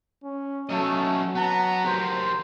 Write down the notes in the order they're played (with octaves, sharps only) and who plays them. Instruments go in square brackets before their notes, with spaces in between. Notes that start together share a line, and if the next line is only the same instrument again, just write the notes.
[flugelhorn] C#4
[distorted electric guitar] F#3 D#5 [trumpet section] A3 [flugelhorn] C#4
[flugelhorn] F#3 [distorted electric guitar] B3 [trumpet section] F#5 A5 A#5
[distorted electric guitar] G4 A#4 [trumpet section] C5